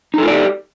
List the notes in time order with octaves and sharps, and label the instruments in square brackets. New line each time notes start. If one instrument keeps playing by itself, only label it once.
[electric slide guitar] D#4
A4
F4
D5
G4